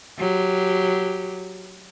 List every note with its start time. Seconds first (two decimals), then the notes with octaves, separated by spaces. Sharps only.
0.19 F#3 G4